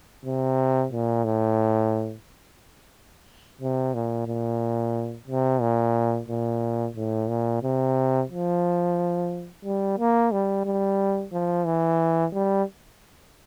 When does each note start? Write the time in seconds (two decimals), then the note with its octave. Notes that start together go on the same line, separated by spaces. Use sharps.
0.25 C3
0.92 A#2
1.25 A2
3.61 C3
3.94 A#2
4.27 A#2
5.28 C3
5.61 A#2
6.28 A#2
6.96 A2
7.29 A#2
7.63 C3
8.30 F3
9.64 G3
9.98 A#3
10.32 G3
10.65 G3
11.33 F3
11.65 E3
12.33 G3